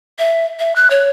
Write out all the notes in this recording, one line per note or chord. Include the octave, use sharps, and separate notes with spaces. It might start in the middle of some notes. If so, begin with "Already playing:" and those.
E5
E5
F#6
C#5